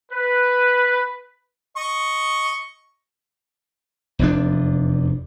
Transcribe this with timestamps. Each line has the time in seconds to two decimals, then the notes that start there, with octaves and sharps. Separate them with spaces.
0.11 B4
1.77 D#5 C#6
4.19 F1 E2 A#2 D4